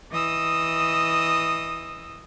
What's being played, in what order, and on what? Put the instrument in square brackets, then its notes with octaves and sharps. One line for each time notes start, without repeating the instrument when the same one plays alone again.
[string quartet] E3 D#5 D#6 E6